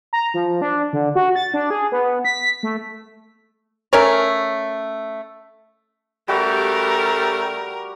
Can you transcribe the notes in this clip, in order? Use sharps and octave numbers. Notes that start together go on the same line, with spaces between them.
A#5
F3
D4
D3
F#4
A6
D4
G#4
B3
B6
A3
A3 C#4 A#4 C#5
C#3 G3 A3 F#4 G4 A#4